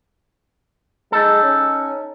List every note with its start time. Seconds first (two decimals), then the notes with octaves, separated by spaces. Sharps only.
1.12 G#3 D#4 A4
1.43 C#4